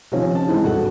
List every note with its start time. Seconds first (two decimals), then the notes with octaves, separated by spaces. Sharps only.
0.12 C3 D#3 F3 C#4
0.35 A5
0.47 D#3 E3 G#3 C4
0.64 D#1 G2 F#4 A4 F#5